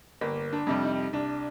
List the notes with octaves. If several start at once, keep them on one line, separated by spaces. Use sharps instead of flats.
G1 A#3
D4
F2 C3 G3
D#4
C2 D4